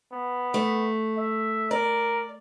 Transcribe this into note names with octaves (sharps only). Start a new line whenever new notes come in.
B3
A3
E5
A#4 D5